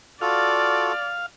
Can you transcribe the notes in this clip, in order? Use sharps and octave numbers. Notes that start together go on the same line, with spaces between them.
F4 F#4 A4 D5 F5